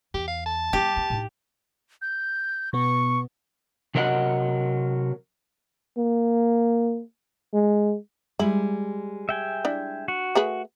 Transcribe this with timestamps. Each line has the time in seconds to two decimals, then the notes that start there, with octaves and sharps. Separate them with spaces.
0.14 E2 G4
0.28 F5
0.46 A5
0.73 G3 B3 G4
0.97 B3
1.10 A2 D#4
2.02 G6
2.73 B2 B3 C#6
3.95 C3 F#3 A#4 D#5 F#5
5.98 A#3
7.54 G#3
8.39 G3 G#3 E4
9.29 E5 G5 G#5
9.65 D4 E4
10.08 F#4
10.35 A3 G#4 B4